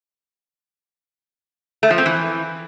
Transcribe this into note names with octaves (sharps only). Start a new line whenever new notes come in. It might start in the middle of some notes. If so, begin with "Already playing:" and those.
A3
F3
C4
E3